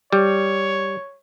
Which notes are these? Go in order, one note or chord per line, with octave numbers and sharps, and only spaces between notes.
G3 C#5